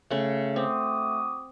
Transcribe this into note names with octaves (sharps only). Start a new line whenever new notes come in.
C#3 A3 F#5
C4 F#4 D6 D#6